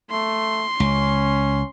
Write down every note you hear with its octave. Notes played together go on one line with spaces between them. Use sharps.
A3 C6
C#2 C#4